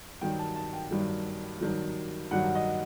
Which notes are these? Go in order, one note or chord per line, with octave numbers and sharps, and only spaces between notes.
G2 D#3 F#3 G5
A5
A5
G5
G2 D#3 F#3
G2 D#3 F#3
G2 D#3 F#3 F#5
D#5